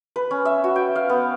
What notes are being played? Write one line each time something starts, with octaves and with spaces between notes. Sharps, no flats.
B4
C#4
E5
F#4
G5
F5
B3